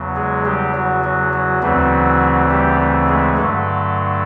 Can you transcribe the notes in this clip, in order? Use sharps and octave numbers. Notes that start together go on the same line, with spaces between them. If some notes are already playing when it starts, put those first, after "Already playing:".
Already playing: E2 C#3 F#3
G#3 G#4
G3 G4
F#3 F#4
F#3 F#4
F#3 F#4
D2 C#3 E3 F#3 A3 C4 F#4
G3 G4
G#3 G#4
G2 D3 F#3 A3 A4